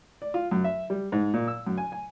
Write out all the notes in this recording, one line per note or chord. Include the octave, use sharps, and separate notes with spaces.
D5
F4
F#2
E5
G3
G#2
A#2
E6
F#2
G#5
G#5